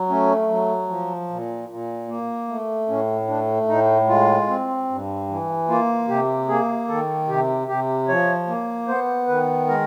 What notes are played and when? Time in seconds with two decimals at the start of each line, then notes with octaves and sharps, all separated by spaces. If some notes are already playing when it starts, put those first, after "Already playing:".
Already playing: F#3
0.09 A3 C#4
0.49 F#3
0.89 F3
1.29 A#2
1.69 A#2
2.08 A#3
2.48 A3
2.88 A2 C#4
3.28 A3 D4
3.68 A2 D#4
4.08 G#3 F4
4.48 C4
4.89 G2
5.28 E3
5.68 A#3 F4
6.08 C3 G4
6.48 A#3 G#4
6.88 D#3 A4
7.28 C3 G4
7.68 C3 G4
8.08 F3 C#5
8.47 A#3
8.88 B3 C5
9.27 D#3 B4
9.68 G#3 A#4